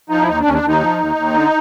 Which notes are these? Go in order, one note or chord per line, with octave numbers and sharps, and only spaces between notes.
F3 D#4
E4
D#2 D#4
D4
D#2 C#4
D4
D#2 D#4
F3
D#2
D#2
D3